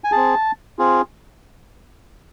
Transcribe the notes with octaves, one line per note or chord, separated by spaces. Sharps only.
G#5
C4 G#4 A5
C4 F4 G#4